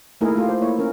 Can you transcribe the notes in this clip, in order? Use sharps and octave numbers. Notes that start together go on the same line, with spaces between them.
A3 A#3 D#4 E4 G#4 A#4
A3 F4 G4
C5
A#3 E4 C#5
C#4 A#4